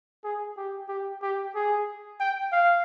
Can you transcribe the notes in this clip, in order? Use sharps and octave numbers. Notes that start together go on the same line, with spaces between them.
G#4
G4
G4
G4
G#4
G5
F5